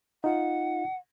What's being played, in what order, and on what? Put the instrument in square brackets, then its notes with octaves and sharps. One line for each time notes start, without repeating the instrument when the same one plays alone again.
[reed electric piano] D#4 F4 [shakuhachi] F#5